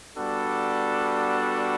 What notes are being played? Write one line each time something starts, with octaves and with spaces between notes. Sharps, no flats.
G3 B3 D4 F#4 A4